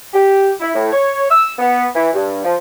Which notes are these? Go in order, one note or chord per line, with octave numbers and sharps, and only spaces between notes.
G4
E4
A2
C#5
E6
B3
E3
G2
F3